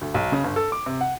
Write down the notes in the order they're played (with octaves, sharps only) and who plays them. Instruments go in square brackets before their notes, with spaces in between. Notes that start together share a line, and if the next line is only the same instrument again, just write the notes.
[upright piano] D2
B1
C#3
G1
A4
D6
C3
F#5